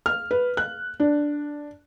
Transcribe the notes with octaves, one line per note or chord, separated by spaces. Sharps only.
F6
B4
F#6
D4